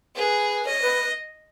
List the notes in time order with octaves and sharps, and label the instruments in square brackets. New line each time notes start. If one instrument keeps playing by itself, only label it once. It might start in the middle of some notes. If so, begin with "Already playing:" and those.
[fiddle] G#4 [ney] B4
[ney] C#5 [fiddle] D#5
[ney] B4